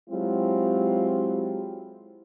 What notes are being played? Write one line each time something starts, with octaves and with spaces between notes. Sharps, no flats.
F#3 G#3 C4 E4 F4 G4